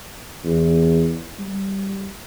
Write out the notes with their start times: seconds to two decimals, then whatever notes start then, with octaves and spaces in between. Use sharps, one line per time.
0.44 E2
1.39 G3